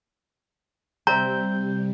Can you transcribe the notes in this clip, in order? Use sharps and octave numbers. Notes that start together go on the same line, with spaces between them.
C3 G3 C4 D5 E5 A#5 G6